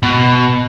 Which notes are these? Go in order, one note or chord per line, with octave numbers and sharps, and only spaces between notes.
B2